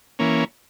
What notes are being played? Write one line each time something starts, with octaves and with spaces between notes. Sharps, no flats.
E3 A#3 C#4